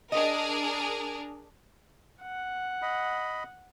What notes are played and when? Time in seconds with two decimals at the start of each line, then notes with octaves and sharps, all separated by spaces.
0.12 D4 G#4 A#4 D#5
2.22 F#5
2.82 D#5 B5